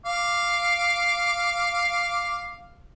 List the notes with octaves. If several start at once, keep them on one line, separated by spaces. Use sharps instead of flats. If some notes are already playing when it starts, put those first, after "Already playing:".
F5 D6